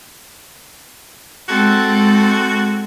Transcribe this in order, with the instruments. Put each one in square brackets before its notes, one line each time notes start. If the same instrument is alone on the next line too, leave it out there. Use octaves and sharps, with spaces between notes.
[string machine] G#3 [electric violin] C4 A4 [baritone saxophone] F#4